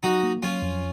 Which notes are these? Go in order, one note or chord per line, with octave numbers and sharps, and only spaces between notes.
F#3 D#4 F#4
A#3
F#3 C#4 F4
F2